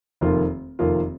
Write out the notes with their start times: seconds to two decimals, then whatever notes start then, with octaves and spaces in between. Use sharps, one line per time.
0.21 F1 F2 D#3 A#3 F4
0.79 F1 F2 D#3 A#3 F4